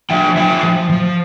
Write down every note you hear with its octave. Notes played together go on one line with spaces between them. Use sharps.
F3 E5 G5
F3 E5 G5
F3
F3